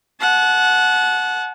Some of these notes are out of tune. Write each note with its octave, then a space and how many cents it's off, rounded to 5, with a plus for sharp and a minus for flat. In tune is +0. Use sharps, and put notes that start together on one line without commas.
F#5 -10 A5 -35